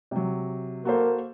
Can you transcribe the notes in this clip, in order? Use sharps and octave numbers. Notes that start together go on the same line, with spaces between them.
C3 F#3
A#3 F#4 A4 C5